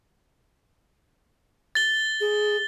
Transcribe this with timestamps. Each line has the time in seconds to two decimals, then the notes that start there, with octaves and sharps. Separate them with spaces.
1.75 A6 G7
2.20 G#4